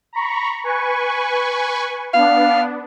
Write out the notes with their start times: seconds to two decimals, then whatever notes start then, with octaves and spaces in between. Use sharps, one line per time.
0.13 A#5 B5 C#6
0.64 B4 G#5 C#6
2.14 B3 D4 F5